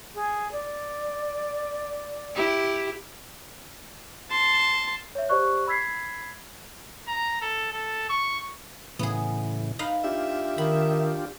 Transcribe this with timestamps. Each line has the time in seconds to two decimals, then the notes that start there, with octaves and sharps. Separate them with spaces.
0.14 G#4
0.52 D5
2.35 E4 G4
4.30 A5 C6
5.15 C#5 E5
5.29 G4 C5 D5 C#6 F#6
5.67 B5 E6 G#6 B6 C7
7.08 A#5
7.41 A4
7.72 A4
8.10 C#6
8.99 A2 C#3 E3 B3 G#4
9.79 D#4 B4 F5
10.04 D4 F4 G4 E5
10.58 D#3 B5